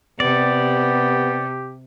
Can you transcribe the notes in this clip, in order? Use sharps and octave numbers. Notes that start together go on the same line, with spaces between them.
C3 B3 G4 D5